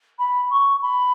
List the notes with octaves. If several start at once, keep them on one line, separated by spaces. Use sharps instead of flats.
B5
C#6
B5